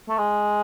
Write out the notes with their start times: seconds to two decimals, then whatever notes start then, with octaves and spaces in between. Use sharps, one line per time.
0.09 A3
0.18 G#3